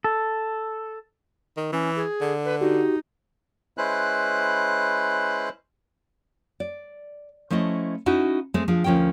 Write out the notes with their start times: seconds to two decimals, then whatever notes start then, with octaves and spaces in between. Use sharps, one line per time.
0.04 A4
1.57 D#3
1.72 E3 C#4
1.96 G#4
2.21 D3
2.45 B4
2.61 D#4 F#4 G4
3.78 G#3 C#4 E4 B4 C5 F#6
6.60 D5
7.50 F3 A3 C#4 E4 D#5
8.06 C#4 D#4 E4 F#4
8.54 G#3 A3 C4
8.68 F3 D4 G#4
8.84 D2 F3 C#4 A#4 G5